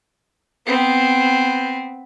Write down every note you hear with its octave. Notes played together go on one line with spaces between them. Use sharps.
B3 C4